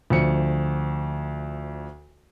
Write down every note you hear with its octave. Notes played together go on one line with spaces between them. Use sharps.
D2 F3 C#7